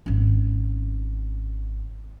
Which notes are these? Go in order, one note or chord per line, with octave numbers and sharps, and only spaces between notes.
G#1 C#4